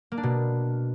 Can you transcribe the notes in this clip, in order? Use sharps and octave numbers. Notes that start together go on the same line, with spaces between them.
A#3
D4
B2